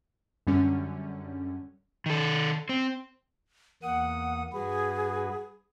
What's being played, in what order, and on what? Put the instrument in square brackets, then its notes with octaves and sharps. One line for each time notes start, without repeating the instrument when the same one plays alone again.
[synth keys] F#2 D3 G3 C#4
[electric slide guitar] D#3 A4
C4
[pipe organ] E2 A#3 D#6 [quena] F#5
[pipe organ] G2 F#4 B4 [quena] G#4